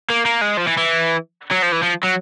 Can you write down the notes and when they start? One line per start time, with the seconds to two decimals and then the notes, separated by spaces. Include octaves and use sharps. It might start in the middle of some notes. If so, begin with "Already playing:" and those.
0.10 A#3
0.26 A#3
0.41 G#3
0.57 F3
0.68 E3
0.78 E3
1.51 F#3
1.62 F3
1.72 E3
1.83 F3
2.04 F#3